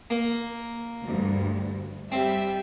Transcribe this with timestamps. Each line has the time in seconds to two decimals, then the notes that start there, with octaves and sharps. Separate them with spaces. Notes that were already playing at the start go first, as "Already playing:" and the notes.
0.10 A#3
1.03 D2 G2
2.12 G3 C4 E5